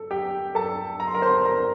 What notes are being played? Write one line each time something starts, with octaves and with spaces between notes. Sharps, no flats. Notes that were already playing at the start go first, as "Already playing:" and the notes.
Already playing: A4
G4 G5
A4 A5
A#5
C6
A#4 A#5
C5 C6
A#4 A#5